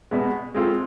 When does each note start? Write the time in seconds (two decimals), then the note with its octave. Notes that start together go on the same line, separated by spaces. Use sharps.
0.11 B2 G#3 B3
0.55 G#3 C4 F4 A4